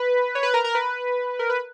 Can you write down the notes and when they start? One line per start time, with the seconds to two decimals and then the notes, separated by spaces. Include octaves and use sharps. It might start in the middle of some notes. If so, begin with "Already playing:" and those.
Already playing: B4
0.35 C#5
0.43 B4
0.54 A#4
0.64 A#4
0.75 B4
1.39 A#4
1.50 B4